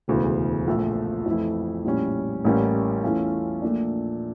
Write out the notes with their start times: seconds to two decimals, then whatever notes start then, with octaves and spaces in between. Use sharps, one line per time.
0.08 E1 D2 C#3 E3
0.67 A#1 A#2 F3 A3
1.26 F2 E3 A3 E4
1.85 A#1 A2 G3 C#4
2.45 A1 A2 G3 A#3 C#4
3.03 E2 E3 A3 C#4 F4
3.62 A#1 A#2 A3 D4